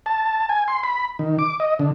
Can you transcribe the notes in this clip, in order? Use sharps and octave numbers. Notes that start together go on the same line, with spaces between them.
A5
G#5
C6
B5
D#3
D6
D#5
D3